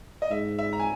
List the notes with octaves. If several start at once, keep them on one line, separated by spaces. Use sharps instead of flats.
D#5
G#2 E5
E5
A#5
G#5